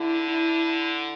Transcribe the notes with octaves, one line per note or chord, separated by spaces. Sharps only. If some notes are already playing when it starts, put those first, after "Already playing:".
Already playing: D3 E4
E4